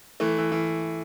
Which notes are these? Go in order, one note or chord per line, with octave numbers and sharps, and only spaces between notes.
E3 A3
E3
E3